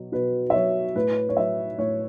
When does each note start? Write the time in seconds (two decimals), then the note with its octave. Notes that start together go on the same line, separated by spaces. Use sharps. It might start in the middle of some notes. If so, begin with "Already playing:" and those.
Already playing: B2 F#3
0.12 B2 B4
0.50 E5
0.54 F#3 C#5
0.95 A2 B4
1.29 C#5
1.37 F#3 E5
1.79 A2 C#5